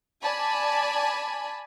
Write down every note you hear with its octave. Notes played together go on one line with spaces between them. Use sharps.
D5 G#5 A5 B5